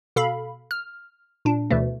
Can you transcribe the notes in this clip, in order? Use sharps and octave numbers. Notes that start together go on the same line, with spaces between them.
B2 A4 F5 B5
F6
A#2 D4
D2 B2 E3 A3